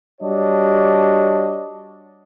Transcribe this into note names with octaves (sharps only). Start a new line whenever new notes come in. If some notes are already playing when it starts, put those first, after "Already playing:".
G3 D4 F#4 C#5 D#5